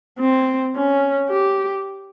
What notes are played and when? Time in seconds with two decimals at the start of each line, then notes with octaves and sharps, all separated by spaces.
0.19 C4
0.76 C#4
1.30 G4